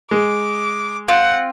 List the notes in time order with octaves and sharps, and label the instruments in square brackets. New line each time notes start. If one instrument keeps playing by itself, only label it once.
[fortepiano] G#3 [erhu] D6
[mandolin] C4 F4 [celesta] F5 D7 [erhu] F#5